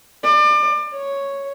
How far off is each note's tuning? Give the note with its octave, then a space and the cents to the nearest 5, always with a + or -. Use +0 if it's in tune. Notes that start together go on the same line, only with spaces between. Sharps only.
D5 +30
C#5 +0